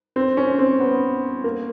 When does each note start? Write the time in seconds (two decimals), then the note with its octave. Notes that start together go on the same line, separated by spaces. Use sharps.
0.16 C4
0.37 C#4
0.59 C4
0.80 B3
1.44 A#3